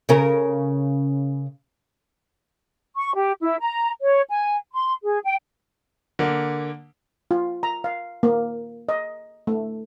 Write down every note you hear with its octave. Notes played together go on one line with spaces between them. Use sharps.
C#3 C#4 A#4
C#6
G4
E4
A#5
C#5
G#5
C6
G#4
G5
D3 A#3
F4
A#5
F5
A#3
D#5
A3